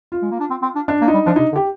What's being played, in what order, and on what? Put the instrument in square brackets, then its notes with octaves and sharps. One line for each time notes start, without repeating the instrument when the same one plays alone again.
[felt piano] F4
[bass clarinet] G#3
A#3
D4
C4
C4
D4
[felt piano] D4
[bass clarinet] A#3
[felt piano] D#4
[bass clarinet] G3
[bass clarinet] F3 [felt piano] D4
[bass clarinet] C3 [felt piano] D#4
[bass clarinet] D3
[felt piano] G4